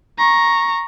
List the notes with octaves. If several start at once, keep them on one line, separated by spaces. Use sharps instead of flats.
A#5 C#6